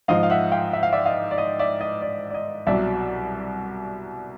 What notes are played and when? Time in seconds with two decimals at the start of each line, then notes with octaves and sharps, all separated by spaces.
0.08 G#2 F3 D#5 F5
0.23 F5
0.30 E5 F#5
0.52 F5 G5
0.73 E5
0.83 F5
0.92 D5 E5
1.05 D#5 F5
1.31 D5
1.38 D#5
1.59 D5 E5
1.81 D#5
2.02 D5
2.30 D5
2.34 D#5
2.67 C2 B2 F#3 D5 E5